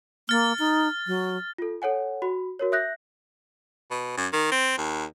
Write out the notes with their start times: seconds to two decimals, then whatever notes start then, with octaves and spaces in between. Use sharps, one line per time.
0.29 A#3 F6 A6
0.59 D#4
1.07 F#3
1.58 F4 A4
1.82 A4 C#5 F#5 G#5
2.22 F#4 B5
2.59 F#4 A#4 C#5
2.72 E5 D#6 F#6 G6 A#6
3.91 B2
4.17 F#2
4.33 D#3
4.52 C4
4.78 D#2